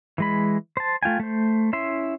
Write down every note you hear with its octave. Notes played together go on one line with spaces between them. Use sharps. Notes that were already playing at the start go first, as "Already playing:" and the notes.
E3 G#3 B5
C5 A5
A3 F4 G5 G#5
A3 C5
C#4 E4 E5 C6